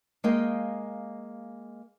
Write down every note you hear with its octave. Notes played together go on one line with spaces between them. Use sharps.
G#3 A#3 D#5 F5 G5